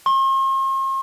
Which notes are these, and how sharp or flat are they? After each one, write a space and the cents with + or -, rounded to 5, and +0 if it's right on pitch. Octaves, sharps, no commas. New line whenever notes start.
C6 +45